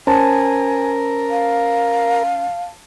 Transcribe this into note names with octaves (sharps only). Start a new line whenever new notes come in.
C#4 A#4 C5 G#5 A5
F5